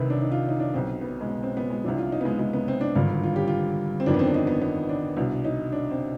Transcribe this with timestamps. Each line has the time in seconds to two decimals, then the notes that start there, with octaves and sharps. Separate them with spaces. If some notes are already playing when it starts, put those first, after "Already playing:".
Already playing: C2 C3 D#3 B4
0.10 D4
0.21 D#4
0.31 F4
0.49 D#4
0.60 D4
0.74 B1 B2 C4
1.01 B3
1.21 G#3
1.28 B3
1.43 C4
1.57 B3
1.70 G#3
1.84 C2 C3 F3 D4
1.98 F4
2.12 D#4
2.21 B3
2.25 G#3
2.39 G#3
2.53 B3
2.68 C4
2.81 D4
2.95 G#1 G2 D3 F4
3.23 F4
3.36 G4
3.47 F4
4.00 C4
4.06 G1 F2 D#3 D4
4.14 B3
4.19 C4
4.27 D4
4.34 D#4
4.47 B3
4.62 B3
4.89 D4
5.17 C2 B2 D4
5.45 D#4
5.72 D4
5.91 C4